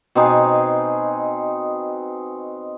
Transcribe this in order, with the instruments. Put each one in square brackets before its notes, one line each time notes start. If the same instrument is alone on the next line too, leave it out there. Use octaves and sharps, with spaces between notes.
[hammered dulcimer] B2 C4 D#4 G#4